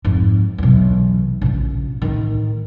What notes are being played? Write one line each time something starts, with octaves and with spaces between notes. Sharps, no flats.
F2 G#2
B1 E2
A#1 C#3
A2 D#3